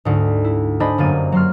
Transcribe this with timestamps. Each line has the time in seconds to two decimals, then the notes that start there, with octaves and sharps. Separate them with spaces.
0.05 D2 G#2
0.45 E4
0.80 D4 C5 D#5 G#5 B5
0.98 G1 F#2 A#3 A6 D#7
1.32 F#3 C6 F6